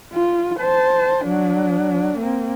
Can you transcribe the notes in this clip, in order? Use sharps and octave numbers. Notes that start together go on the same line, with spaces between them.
F4
C5 A5
F#3 D4
A#3 C4